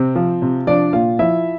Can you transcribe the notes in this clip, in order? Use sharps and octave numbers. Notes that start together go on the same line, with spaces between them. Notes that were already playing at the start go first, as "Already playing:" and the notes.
Already playing: C3 C4
F3
C3
F3 D4 D5
A#2 F4 F5
F3 E4 E5